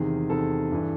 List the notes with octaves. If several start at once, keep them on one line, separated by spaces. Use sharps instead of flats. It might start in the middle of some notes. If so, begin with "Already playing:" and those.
Already playing: E2 C3 D#3 G#4
E2 C3 D#3 A4
G2 E3